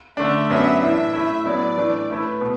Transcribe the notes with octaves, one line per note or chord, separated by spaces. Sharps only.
D3 A3 D4 E5
F#2 F#3 B3 D4 E5
A2 E3 D4 E5
A2 A3 E4
A2 F#3 B3 E4 D5
A2 E3 A3 D4
A2 A3 E4 B4
B2